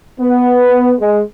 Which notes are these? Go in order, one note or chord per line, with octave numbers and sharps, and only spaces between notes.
B3
G#3